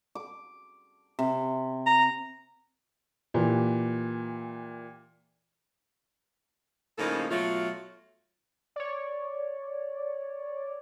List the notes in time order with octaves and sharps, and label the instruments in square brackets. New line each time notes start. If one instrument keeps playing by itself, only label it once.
[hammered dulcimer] D6
C3
[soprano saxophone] A#5
[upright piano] A#2 E3 G4
[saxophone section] A2 C#3 F3 A#3 D#4 A4
B2 F#3 A3 F4
[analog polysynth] C#5 D5